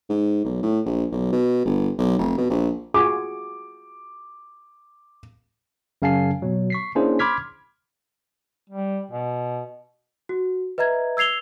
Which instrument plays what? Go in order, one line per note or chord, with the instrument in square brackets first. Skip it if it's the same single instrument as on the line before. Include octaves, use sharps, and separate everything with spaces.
[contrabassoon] G#2
B1
A2
A#1
B1
B2
G1
B1
F1
B2
A#1
[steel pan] F4 F#4 G#4 [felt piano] D6
[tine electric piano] F#2 C#3 F5 G#5 A5 C7
B2 F#3
C#6 B6 C7
A#3 C#4 D4 E4 G#4 C5
B5 C6 D6 F6 G#6 B6
[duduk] G3
B2
[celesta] F#4
B4 D#5 E5 A#5 G#6
E6 G#6 C7 F7 G7